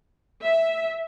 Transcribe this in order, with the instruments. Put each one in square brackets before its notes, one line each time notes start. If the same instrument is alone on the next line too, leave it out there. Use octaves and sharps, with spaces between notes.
[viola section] E5